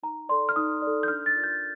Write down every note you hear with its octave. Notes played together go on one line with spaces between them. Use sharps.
D#4 A#5
A4 D5 C6
F6
D#4 D#6
A4 D5
G6
D4 F6
A6
F4 A#4 D5
G6